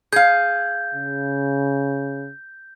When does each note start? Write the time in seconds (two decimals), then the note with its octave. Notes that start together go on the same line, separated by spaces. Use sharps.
0.13 G#4 F5 G6
0.94 C#3